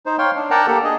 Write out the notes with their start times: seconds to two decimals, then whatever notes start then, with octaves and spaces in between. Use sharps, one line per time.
0.06 D#4 C5
0.18 C#5 F5 G5 C6
0.36 D4
0.51 A#4 D5 F#5 G5 A5 A#5
0.67 A#3 G4 A4
0.84 D4 G#4 D#5